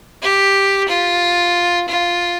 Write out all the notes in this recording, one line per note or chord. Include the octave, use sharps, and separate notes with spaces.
G4
F4
F4